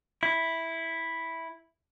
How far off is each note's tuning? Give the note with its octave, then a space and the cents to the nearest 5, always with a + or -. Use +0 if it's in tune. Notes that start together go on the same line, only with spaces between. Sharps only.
E4 -5